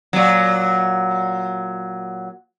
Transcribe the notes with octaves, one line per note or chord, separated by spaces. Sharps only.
A#2 F#3